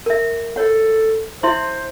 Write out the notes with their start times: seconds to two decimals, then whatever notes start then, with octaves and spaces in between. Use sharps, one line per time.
0.06 A#4 E5
0.56 A4 C#5 F#5
1.43 E4 C5 E5 C6